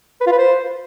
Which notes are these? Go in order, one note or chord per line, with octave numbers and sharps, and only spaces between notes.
B4
F4
B4
C5